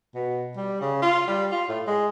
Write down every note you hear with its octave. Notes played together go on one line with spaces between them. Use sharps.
B2
G3
C#3
F4
G3
F4
A2
G#3